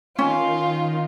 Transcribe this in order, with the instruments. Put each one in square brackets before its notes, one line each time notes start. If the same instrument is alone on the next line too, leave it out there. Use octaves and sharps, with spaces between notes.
[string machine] D#3 [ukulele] C#4 [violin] F4